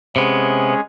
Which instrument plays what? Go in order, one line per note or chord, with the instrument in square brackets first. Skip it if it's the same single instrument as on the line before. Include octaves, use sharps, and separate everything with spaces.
[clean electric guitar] C3 B3 [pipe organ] G#3 C#4 G#4